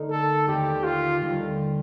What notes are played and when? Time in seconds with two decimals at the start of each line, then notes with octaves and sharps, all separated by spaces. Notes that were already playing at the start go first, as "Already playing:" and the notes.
Already playing: D3 A3 D#4 A#4
0.11 A4
0.47 D#2 D3 A3 C4 G4
0.84 F4
1.21 D#2 D3 G3 C4